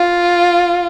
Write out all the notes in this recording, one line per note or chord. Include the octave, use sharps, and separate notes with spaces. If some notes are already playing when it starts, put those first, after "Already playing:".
Already playing: F4